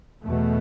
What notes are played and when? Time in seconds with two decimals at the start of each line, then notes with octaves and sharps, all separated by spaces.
0.23 E2 B2 A3